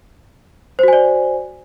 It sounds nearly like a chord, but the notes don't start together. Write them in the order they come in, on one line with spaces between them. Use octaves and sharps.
C5 F#4 G#5 D5